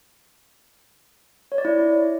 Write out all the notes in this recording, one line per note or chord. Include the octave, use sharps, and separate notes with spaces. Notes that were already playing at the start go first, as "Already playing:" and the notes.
C#5
D5
E4